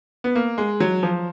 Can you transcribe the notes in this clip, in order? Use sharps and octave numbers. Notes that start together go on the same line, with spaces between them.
B3
A#3
G#3
F#3
F3